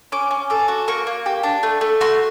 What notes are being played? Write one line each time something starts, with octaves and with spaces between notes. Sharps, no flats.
C#4 D6
C#4
A4 D6
F#4
A#3 C#6
A#3
G4
D4
A3
A3
F#4 C6